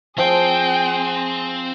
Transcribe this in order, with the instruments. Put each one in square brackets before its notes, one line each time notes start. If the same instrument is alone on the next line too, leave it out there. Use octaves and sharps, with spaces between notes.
[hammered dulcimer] F3 [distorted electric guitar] C4 [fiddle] G#4 [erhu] G5